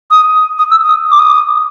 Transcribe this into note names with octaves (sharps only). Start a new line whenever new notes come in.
D#6
D#6
E6
D#6
D6
D#6